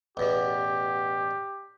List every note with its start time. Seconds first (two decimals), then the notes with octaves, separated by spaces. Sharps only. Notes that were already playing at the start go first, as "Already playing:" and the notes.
0.17 A1 E2 B2 G4